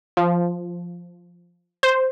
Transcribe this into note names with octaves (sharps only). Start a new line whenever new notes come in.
F3
C5